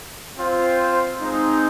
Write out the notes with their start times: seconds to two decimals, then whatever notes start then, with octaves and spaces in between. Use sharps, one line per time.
0.37 C4 F4 C5
1.19 G#3 C4 D#4 G#4 C5